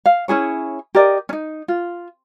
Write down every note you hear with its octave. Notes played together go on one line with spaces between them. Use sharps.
F5
C#4 E4 G#4 C#5
G4 A#4 D5 D#5
C#4 D#4
F4